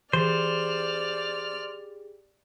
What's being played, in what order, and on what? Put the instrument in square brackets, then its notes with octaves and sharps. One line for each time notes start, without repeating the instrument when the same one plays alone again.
[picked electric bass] E3 [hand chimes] G4 G#4 [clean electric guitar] C5 [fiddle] D5 F6